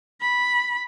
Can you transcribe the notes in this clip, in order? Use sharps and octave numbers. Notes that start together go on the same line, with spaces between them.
B5